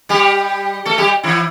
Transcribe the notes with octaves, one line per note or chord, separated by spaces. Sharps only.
G3 G4
A3 A4
G3 G4
E3 E4